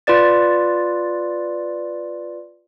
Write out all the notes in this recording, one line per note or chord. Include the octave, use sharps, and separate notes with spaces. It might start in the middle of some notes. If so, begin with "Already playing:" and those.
F4 B4 D5 A6